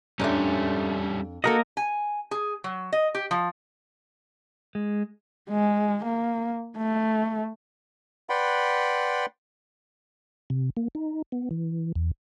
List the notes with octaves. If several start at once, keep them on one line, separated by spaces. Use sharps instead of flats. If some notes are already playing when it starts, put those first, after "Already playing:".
F2 G#2 G3 A3 C#4 D4
A#3 F#4 G4 A4 A#4 D#5
G#5
G#4
F#3
D#5
G4
F3
G#3
G#3
A#3
A3
B4 D5 F#5 G5 B5 C6
C3
A#3
D#4
B3
E3
E2